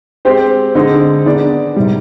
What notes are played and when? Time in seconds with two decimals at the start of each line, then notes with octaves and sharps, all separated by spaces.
0.25 G#3 C4 G4 C5
0.75 D3 G#3 C4 D#4
1.26 D#3 B3 D4 G#4 D5
1.76 C3 D#3 G3